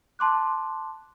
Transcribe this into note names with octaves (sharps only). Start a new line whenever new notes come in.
A5 C6 D6 F#6